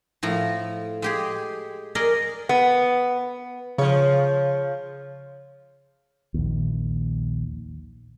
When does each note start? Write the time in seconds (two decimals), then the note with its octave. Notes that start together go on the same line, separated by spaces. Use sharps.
0.23 A2 F3 A#5
1.02 G#3 G4 G#4
1.95 G#4 A#4 D5 D#5 G#5
2.49 B3
3.78 C#3 F3 C#5
6.34 A#1 D#2